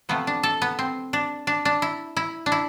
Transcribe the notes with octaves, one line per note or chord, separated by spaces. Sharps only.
C3 F3 A3 B3
D4
A4
B3
C4
D4
D4
D4
E4
E4
D4
E4